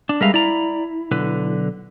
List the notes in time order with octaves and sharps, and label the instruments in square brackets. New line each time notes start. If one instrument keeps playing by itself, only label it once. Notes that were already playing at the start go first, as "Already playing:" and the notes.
[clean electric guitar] D4
[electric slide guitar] G3 G#3 E5 [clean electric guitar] A#4 B4 F5
[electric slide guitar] E4 [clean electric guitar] D5 A#5
[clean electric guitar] B1 D3 B4